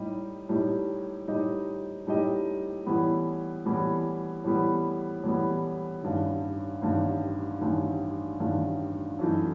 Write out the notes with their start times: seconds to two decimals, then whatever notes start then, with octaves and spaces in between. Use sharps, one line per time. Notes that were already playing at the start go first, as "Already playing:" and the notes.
Already playing: A2 G3 D#4 G4 D#5
0.49 A2 G3 D#4 G4 D#5
1.28 A2 G3 D#4 G4 D#5
2.07 A2 G3 D#4 G4 D#5
2.86 A2 E3 G3 B3
3.65 A2 E3 G3 B3
4.44 A2 E3 G3 B3
5.23 A2 E3 G3 B3
6.03 A1 G2 D#3
6.82 A1 G2 D#3
7.61 A1 G2 D#3
8.40 A1 G2 D#3
9.19 F#2 E3 A3 D#4